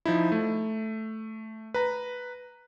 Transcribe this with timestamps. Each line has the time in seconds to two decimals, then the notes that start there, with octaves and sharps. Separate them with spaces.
0.06 F3 D#4 E4
0.32 A3
1.74 B4 A#5